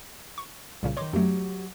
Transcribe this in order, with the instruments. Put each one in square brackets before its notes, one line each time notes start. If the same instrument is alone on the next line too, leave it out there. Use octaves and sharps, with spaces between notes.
[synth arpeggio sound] C#6
C2 A#2 C#3
[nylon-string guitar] D#3 D#5 [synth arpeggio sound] C#5 C6 D6
[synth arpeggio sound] F#2 A3 [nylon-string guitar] F#3 G4